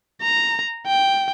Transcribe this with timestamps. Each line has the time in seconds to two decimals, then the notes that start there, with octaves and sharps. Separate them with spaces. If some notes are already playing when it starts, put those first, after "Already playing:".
0.21 A#5
0.87 G5